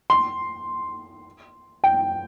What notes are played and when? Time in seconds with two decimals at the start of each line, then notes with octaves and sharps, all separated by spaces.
0.10 C6
1.84 G5